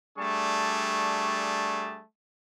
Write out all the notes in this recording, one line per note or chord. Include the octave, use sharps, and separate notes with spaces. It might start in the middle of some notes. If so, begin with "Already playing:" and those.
G3 A3 D4 G#4 A5 C#6